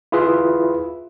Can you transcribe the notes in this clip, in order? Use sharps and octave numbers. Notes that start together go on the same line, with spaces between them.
E4 F4 G#4 B4 E5